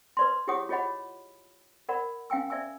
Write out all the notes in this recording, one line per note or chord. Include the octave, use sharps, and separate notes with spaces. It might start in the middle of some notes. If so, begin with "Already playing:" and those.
B4 D5 C6
E4 G4 G#4 C#5 F#5 D#6
F4 G#4 C#5 D#5 F#5 B5
A#4 D5 F#5 B5
C#4 F5 G5 G#5 E6
D5 E5 G#5 E6